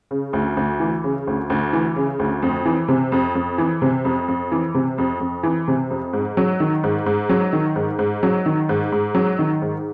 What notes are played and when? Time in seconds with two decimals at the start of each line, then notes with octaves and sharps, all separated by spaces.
0.11 C#3
0.33 D2
0.57 D2
0.80 E3
1.04 C#3
1.27 D2
1.50 D2
1.73 E3
1.96 C#3
2.19 D2
2.43 F2
2.66 E3
2.88 C3
3.12 F2
3.35 F2
3.58 E3
3.82 C3
4.05 F2
4.28 F2
4.52 E3
4.75 C3
4.98 F2
5.20 F2
5.43 E3
5.68 C3
5.90 F2
6.13 G#2
6.37 F#3
6.60 D#3
6.83 G#2
7.06 G#2
7.29 F#3
7.53 D#3
7.76 G#2
7.99 G#2
8.23 F#3
8.46 D#3
8.69 G#2
8.92 G#2
9.15 F#3
9.39 D#3
9.62 G#2